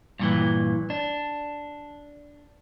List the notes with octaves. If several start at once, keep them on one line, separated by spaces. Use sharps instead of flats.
G2 A#2 E3
D4